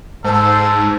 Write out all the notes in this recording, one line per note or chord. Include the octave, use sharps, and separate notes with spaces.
G#2 A4 C5